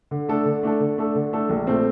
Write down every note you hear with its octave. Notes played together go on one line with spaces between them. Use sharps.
D3
A3 D4 A4
D3
A3 D4 A4
D3
A3 D4 A4
D3
A3 D4 A4
A#1
A#2 A3 C4